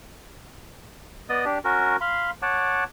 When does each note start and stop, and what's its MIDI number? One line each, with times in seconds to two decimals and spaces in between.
1.29 1.45 59
1.29 1.45 74
1.29 1.45 75
1.29 1.45 87
1.45 1.58 62
1.45 1.58 67
1.65 1.96 61
1.65 1.96 66
1.65 1.96 70
2.01 2.31 77
2.01 2.31 83
2.01 2.31 84
2.42 2.84 73
2.42 2.84 78
2.42 2.84 81
2.42 2.84 86